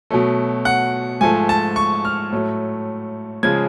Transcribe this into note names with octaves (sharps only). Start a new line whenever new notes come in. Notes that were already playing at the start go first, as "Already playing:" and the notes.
B2 F#3 A3
F#5
G#2 F3 A3 G#5
A5
C#6
F6
A2 F#3 A3
C#3 F3 G#3 G#6